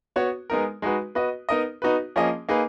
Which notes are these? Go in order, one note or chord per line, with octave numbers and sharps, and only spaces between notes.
B3 F#4 C#5
G#3 B3 D#4 A#4
G#3 D#4 F#4 B4
B3 F#4 B4 D#5
B3 D#4 A#4 D#5
B3 D#4 F#4 B4
F3 A#3 C#4 G#4 D#5
A#3 D#4 G#4 B4